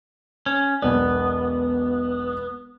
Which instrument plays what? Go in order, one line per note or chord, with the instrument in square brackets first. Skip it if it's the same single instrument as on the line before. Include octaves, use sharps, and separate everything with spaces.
[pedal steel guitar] C#4
[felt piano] E1 B1 D5 [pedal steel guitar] B3